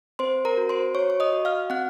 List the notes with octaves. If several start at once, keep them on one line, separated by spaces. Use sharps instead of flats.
C4 C5 C6
A#4 A#5
F#4
C5 C6
F#4 C#5 C#6
C#6
D#5 D#6
F#4
F5 F6
C4 F#5 F#6